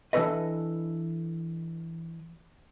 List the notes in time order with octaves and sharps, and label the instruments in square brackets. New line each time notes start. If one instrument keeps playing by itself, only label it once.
[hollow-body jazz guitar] E3 D4 G4 A4 B4 D#5